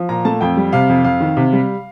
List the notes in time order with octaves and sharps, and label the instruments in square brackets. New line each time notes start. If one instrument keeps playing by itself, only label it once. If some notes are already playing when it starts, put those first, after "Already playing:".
Already playing: [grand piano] F3
A#2 A#5
A3 A5
F2 G5
G3
C3 F5
F2
F2 F5
D#3
C3
G3